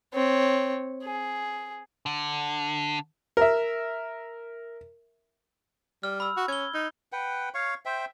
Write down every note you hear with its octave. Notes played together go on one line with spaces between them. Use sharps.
C4 C#5
G#4
D3
A#4 E5
G3 F6
B5 E6
F#4
C#4 G#6 G7
D#4
B4 F#5 G5
C#5 F5 C#6
C5 E5 G5